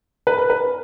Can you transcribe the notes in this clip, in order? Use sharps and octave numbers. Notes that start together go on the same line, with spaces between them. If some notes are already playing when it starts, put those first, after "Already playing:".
B4
A#4
B4